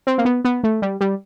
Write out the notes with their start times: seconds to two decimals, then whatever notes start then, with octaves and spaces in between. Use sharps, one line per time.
0.07 C4
0.18 A#3
0.25 B3
0.45 B3
0.64 A3
0.82 G3
1.01 G3